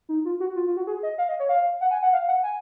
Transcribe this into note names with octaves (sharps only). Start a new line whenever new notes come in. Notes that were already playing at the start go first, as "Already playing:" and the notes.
D#4
F4
F#4
F4
F4
F#4
G#4
D#5
F5
D#5
C#5
F5
F#5
G#5
F#5
F5
F#5
G#5